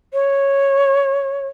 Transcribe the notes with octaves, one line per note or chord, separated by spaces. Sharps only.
C#5